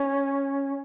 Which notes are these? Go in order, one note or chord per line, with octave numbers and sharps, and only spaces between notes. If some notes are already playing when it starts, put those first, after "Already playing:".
Already playing: C#4